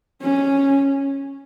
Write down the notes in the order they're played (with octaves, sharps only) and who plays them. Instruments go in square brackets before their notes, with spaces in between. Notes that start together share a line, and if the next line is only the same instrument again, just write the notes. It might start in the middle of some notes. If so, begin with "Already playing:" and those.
[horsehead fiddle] C#4